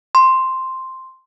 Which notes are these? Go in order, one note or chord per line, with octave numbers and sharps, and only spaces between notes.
C6